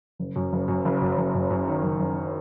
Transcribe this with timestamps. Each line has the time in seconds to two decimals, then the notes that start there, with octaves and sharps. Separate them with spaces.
0.19 F#1
0.36 F#2
0.53 F#1
0.68 F#2
0.85 F#1
1.02 F#2
1.18 F#1
1.35 F#2
1.50 F#2
1.67 D#3
1.83 F#1
2.00 F#1